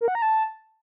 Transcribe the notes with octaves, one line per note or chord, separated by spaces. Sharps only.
A#4
F#5
A#5
A5